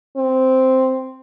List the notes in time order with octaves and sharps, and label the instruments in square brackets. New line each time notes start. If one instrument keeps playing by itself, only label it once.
[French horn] C4